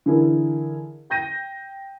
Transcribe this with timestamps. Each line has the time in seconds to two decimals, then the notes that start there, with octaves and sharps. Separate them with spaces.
0.06 D3 E3 E4 G#4 A#4
1.10 G5 G6 A#6 D#7